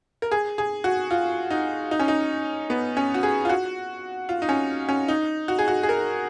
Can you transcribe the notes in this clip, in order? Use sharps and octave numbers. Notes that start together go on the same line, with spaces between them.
A#4
G#4
G#4
F#4
F4
D#4
D#4
C#4
D#4
B3
C#4
F#4
G#4
F4
F#4
F4
D#4
C#4
C#4
D#4
F#4
G#4
F#4
G#4
A#4